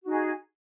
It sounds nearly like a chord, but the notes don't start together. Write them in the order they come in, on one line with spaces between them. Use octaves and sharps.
F#4 D#4 G#4